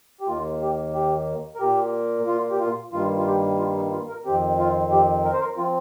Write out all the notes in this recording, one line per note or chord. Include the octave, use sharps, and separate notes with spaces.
G4
D#2 D#3 A#3 F4
G4
G4
A#4
A#2 A#3 G4
F4
G4
F4
G2 D#3 G3 A#3 F4
F4
G4
F4
D#4
F4
A#4
F2 D#3 C4 G4
F4
G4
A#4
C5
A#4
F3 C4 F4